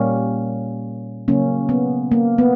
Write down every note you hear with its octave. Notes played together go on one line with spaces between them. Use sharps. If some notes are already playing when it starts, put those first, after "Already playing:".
Already playing: A#2 G3 A#3 C#4
C#3 F#3 A#3 C#4
B3
A#3
B3